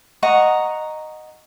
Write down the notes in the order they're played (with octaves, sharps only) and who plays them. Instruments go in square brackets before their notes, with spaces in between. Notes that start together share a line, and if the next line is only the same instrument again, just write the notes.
[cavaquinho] D#5 F#5 A#5 C#6